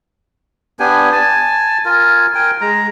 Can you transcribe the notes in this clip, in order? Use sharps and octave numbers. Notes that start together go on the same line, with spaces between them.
B3 D4 G4 G#5
G#5 A5
F4 A#4 G#5
A#4 G5 G#5
G#3 A#5